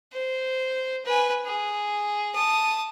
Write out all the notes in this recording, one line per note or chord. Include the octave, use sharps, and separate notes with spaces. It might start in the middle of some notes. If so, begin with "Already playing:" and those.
C5
B4 G#5
G#4
A5 D#6